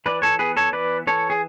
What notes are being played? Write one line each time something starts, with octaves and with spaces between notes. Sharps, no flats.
E3 B4 D5
A4 C#5
B3 G#4 B4
A4 C#5
E3 B4 D5
E3 A4 C#5
G#4